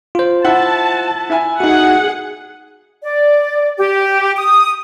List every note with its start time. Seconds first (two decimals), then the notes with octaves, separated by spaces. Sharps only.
0.15 F4 C5
0.45 E4 F#5 A5
1.30 E4 E5 G#5
1.60 D#4 F#4 G#4 F#5
3.02 D5
3.77 G4
4.35 D#6